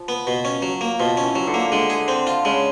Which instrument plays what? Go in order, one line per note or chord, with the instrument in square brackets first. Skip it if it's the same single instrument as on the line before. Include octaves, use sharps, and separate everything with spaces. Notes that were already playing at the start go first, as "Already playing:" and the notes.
Already playing: [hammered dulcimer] F3
[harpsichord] B3
B2
C#4
F#3
A#3
[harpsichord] B2 [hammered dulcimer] F3
[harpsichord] C#4
[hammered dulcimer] E3
[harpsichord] F#3
[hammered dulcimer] D3
[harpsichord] A#3
[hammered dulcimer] D3 [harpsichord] G#3
[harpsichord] G#4
C4
F4
[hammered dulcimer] C#3 [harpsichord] G#3